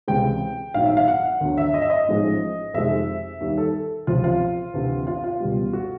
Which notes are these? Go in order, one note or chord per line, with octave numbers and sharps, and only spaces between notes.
C#2 C3 E3 G#3 G5
A#1 G#2 D#3 F#3 F5
E5
F5
F#5
D2 D3 F#3
E5
D#5
E5
D#5
A1 G#2 F3 G#3
F2 C3 D#3 G#3 E5
D#2 D#3 G3
A4
C#2 C3 F3 F4
F4
D2 C3 E3
F4
F4
C#2 B2 G3
F#4